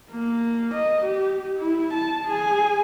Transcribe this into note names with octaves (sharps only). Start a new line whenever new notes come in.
A#3
D#5
G4
E4
A5
G#4 G#5